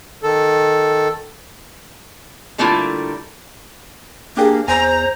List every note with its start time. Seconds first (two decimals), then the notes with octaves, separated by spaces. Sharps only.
0.23 D#3 A4
2.58 D3 G3 A3 A#3 E4 F4
4.37 A#3 D4 G4 G#4
4.68 E2 C5 G#5 A#5